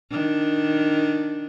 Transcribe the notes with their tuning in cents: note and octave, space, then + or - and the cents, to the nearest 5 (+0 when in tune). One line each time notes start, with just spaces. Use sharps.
D#3 +0 D4 +0